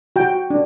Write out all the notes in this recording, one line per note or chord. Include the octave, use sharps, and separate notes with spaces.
F#4 G5
D4